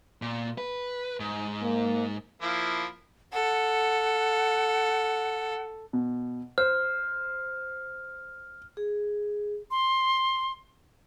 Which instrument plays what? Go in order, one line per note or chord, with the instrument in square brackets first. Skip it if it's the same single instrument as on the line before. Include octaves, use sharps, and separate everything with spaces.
[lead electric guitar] A#2
B4
G#2
[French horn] A#3
[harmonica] F3 A#3 E4
[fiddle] A4 [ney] F#5
[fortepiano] B2
[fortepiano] C5 [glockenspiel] F6
[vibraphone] G#4
[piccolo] C6